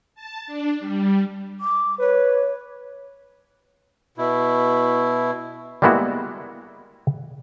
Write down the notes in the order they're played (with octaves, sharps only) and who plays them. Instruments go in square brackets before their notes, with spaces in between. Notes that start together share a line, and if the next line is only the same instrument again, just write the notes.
[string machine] A5
D4
G3
[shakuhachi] D6
[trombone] B4 [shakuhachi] C#5
[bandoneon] B2 E4
[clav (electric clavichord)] G3 G#3 A#3 B3 E4 F#4